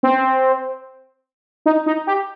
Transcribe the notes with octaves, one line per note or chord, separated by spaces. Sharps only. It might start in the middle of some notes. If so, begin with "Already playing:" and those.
C4
D#4
D#4
G4